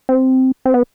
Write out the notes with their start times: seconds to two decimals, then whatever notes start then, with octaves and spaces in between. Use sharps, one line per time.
0.09 C4
0.65 C4
0.74 B3